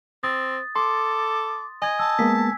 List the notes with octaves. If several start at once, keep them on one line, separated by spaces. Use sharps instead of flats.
C4 D#6 A6
A4 C6 D6
D#5 G#5 G#6
A5 E6
G#3 A#3 B3 B6